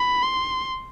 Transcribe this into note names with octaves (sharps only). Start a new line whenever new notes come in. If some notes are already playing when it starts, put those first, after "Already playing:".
Already playing: B5
C6